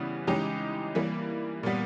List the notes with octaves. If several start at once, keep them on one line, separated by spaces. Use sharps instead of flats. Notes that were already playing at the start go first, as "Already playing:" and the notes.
Already playing: C#3 E3 G3 B3
C#3 E3 G#3 D#4 G4
E3 G3 A#3
A#2 G3 B3